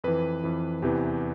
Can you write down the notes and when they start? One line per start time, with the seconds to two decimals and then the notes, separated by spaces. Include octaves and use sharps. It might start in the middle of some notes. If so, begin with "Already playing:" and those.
0.04 F2 E3 B4
0.44 F2 E3
0.82 E2 C3 E3 G4